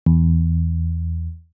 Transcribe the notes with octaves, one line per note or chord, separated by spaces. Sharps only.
E2